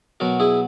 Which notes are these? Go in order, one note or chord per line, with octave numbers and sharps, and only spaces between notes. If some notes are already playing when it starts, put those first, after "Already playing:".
B2 F#3 F#4 A#4
E4 G#4